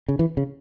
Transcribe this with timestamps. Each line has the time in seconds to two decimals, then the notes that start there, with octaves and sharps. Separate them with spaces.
0.08 C#3
0.19 E3
0.37 C#3